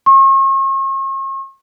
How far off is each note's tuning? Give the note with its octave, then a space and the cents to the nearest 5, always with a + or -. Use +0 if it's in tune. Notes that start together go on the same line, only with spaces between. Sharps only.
C#6 -45